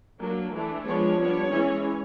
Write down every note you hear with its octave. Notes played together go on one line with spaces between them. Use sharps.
F#3 A#3 D4
E3 A3 D4
F3 G#3 B3 D4 C#5
G3 B3 D4
E3 G#3 C#4